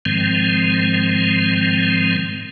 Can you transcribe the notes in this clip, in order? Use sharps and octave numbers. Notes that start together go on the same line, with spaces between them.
G#2 D#3 F3 G#3 C4